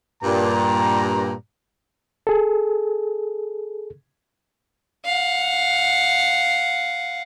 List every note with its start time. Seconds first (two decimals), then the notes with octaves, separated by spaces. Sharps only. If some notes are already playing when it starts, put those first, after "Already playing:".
0.23 G2 A#2 A#5
2.27 G#4 A4
5.05 F5 F#5